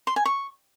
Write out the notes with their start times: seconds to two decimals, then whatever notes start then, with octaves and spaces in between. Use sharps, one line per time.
0.07 C6
0.16 G#5
0.26 C#6